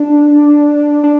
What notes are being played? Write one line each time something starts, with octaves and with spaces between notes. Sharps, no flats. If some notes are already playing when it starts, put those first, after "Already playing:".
Already playing: D4
D4